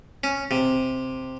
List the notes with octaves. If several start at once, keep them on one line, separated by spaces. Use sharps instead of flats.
C#4
C3